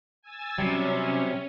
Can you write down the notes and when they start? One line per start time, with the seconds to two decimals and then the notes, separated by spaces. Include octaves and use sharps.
0.22 G#5 E6 A6
0.59 C3 F#3 G3 C#4